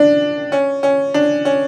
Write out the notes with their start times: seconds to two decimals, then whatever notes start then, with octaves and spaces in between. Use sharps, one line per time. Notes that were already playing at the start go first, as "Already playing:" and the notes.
Already playing: D4
0.52 C#4
0.83 C#4
1.14 D4
1.45 C#4